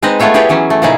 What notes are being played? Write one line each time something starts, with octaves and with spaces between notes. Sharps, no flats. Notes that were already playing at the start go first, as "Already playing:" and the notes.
G#3 C4 D#4 B4 D#5
A3 B3 F4 C#5 E5
E4 G4 G#4 B4 C#5 D5
E3 F#3 C#4
A3
A#2 C#3 C#4 D#4 E4 G#4